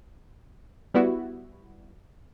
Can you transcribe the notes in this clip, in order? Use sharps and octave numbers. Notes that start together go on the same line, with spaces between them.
G3 B3 E4 F#4